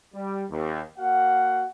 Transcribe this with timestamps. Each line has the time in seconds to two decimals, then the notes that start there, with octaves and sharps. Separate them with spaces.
0.14 G3
0.50 D#2
0.98 A#3 F#4 F5 F#5